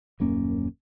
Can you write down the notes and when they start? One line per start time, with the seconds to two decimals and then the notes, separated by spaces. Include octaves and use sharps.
0.20 D#1 F#2 A#3 C#4